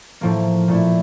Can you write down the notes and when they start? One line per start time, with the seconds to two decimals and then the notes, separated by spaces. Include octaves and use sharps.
0.21 A2 F3 A#3
0.68 A#2 A3 E4